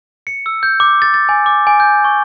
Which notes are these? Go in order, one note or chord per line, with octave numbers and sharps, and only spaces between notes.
C#7
E6
G6
D6
A6
A6
G#5
D6
G#5
G6
C#6